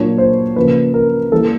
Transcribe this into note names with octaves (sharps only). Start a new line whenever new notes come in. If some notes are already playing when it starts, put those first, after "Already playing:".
Already playing: A#2 F#3 A#3 D4 C#5
C5
C#3 F3 A#3 B4
A#4
E3 G3 A#3 A4